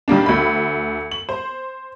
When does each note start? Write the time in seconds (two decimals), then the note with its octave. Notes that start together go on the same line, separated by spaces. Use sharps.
0.08 D#3 G3 A#3 D4
0.26 D2 B5
1.11 F#7
1.29 C5